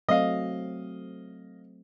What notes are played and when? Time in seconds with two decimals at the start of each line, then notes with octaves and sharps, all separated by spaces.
0.09 F#3 A3 C4 D#5 F5